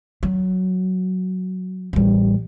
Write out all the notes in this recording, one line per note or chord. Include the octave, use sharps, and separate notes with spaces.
F#3
A1 G3